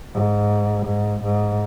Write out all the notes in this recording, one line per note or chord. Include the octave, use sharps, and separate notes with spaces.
G#2
G#2
G#2